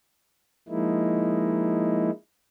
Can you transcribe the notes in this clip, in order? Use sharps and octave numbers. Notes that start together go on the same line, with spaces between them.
F3 G#3 A#3 D#4 E4